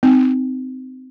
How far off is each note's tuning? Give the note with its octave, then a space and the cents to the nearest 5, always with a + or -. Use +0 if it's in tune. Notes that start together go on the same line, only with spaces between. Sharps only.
C4 -20 D#4 -5